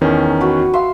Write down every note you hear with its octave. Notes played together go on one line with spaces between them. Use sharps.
E2 D#3 C#4
F#4 B4
E5 F5 C6